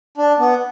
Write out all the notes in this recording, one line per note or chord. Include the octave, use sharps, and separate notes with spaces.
D4
B3